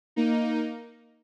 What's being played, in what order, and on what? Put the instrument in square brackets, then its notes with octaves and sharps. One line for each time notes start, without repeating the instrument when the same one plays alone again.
[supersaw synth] A#3 D#4